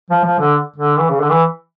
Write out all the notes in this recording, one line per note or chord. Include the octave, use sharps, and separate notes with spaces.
F3
F3
D3
D3
E3
C#3
D3
E3